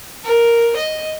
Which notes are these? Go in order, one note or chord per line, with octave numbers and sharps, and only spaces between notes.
A#4
D#5